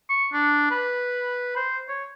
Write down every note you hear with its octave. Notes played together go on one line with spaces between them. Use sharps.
C#6
D4
B4
C5
C#5